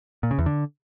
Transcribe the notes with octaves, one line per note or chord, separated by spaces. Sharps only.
A#2
C#3
E2
D3